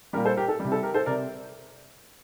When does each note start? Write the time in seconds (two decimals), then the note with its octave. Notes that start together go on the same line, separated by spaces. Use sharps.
0.13 G3 G4 A#4
0.16 A#2
0.25 A4 C5
0.37 G4 A#4
0.48 A4
0.60 C3 G3
0.72 A4
0.83 G4 A#4
0.94 A4 C5
1.06 C3 A#4 D5